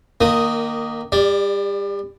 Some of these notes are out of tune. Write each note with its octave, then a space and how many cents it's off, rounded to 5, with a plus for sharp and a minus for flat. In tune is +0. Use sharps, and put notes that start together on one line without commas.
D#3 -20 A#3 +0 D#6 +0
G3 +35 D5 +0